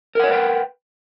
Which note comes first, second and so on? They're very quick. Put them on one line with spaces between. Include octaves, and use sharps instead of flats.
A#4 F#5 C#5 B4 G5